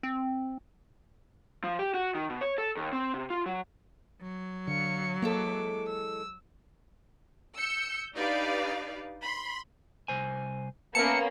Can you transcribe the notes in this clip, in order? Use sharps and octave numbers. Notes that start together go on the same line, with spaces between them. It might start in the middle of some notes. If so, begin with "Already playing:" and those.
C4
F3
G4
F#4
D#3
B2
C#5
A4
D#2
C4
C3
F4
F#3
F#3
D3 F5 C#7
E3 G#3 A#3 A4 D6
E6
E6 G6 C#7
D4 D#4 G4 B4 D5 F5
B5 C6
C2 C5 G#5
A#3 B3 C#4 A#4 E5 A5 C#7